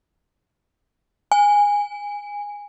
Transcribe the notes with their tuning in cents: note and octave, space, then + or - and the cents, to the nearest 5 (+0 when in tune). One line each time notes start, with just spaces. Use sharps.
G#5 -15